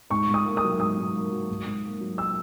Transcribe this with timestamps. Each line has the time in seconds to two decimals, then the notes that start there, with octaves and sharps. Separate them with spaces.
0.10 G#2 C#6
0.28 G#2
0.34 D#6
0.45 A#3
0.57 D#6
0.63 F#3
0.79 G#2 D#6
0.98 G#2
1.14 A#3
1.31 F#3
1.49 G#2
1.65 G#2
1.84 A#3
2.00 F#3
2.18 E6